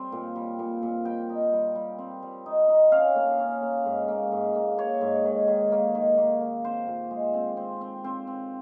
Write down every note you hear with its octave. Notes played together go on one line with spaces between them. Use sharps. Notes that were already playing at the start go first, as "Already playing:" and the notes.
Already playing: G3 C4
A#2
G3
A#2
A#2
G3 G5
D#4
G3
G3
C4
G3
D#4
D#4
C#4 F5
A#3
C#4
A#3
G#2
A#3
G#2
A#3
A#3 C#5
G#2
D#3
D#3
A#3
D#3
A#3
A#3
C4 C5
A#2
G#3
C4
C4
C4
C4
C4